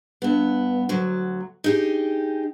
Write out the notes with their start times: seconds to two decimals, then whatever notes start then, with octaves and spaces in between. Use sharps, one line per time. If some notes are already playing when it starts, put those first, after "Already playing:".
0.22 G2 B3
0.89 D2 F#3
1.64 D#4 G4 G#4